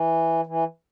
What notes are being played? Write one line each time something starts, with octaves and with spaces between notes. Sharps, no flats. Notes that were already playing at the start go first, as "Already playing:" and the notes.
Already playing: E3
E3